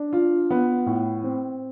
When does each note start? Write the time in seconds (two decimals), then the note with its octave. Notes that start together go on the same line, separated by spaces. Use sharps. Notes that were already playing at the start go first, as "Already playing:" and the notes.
Already playing: D4
0.13 F4
0.50 B3
0.86 A2
1.24 C4